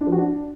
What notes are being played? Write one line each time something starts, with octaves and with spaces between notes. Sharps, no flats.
D4
F3
F#4
D4